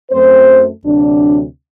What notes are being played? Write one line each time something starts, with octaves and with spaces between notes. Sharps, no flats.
F#2 F#3 A3 C4 C5
D2 C3 F#3 D4